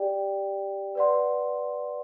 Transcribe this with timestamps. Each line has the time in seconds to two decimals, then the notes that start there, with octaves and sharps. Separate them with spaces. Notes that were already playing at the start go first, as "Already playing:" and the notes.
Already playing: G4 D5 G5
0.95 B4 D5 F#5 C6